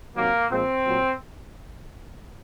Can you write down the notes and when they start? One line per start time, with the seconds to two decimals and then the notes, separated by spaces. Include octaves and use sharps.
0.15 C3 D#3 F#3 A#3
0.50 A#2 F3 G#3 C4
0.85 A#2 F#3